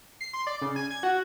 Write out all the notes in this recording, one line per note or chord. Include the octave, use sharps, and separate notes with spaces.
C7
C6
D5
C#3
G#5
G#6
F#4